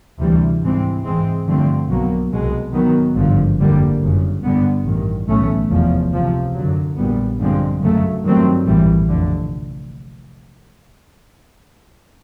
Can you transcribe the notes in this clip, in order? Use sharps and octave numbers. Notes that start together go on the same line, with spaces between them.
D2 C3 E3 G3
G#2 E3 G#3 C4
G#2 E3 G#3 C4
G2 D3 F3 A3 C4
B1 B2 F#3 A#3
C2 B2 G#3
G#2 D#3 F#3 B3
G#1 G2 D3 F3
F#1 F2 D3 G3 A#3
G1 F#2 C#3
G2 D3 G3 B3
A1 G2 D#3
B1 A2 E3 A3 C#4
F1 E2 C#3 F3
C#2 C3 F3
F#2 D3 F#3
A#1 A#2 G3 B3
G2 D3 F3 G#3 C4
F#2 C#3 F#3 A3
G2 D#3 F#3 A3 C4
A#1 A2 E3 G3
F1 F2 D3